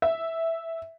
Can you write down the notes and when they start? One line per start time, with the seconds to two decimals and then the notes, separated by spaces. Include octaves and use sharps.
0.02 E5